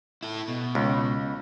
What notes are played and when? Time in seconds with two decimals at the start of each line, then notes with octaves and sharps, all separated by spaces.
0.23 E4 A4
0.48 B2
0.75 C#2